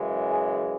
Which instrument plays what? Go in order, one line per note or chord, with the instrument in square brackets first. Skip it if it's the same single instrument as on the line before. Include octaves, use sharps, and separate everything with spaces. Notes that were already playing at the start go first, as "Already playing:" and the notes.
Already playing: [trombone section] F#2 C#3 E3 G#3
G#4